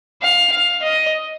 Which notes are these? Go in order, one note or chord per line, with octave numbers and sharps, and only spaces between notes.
F5
F5
D#5